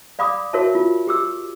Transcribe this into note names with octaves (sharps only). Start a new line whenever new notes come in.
D5 F5 B5 D6 D#6
F#4 A#4 C#5 E5 A5
F4
G4 D6 E6